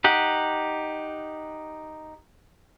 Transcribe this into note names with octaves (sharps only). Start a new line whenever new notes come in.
D#4 G4 F#5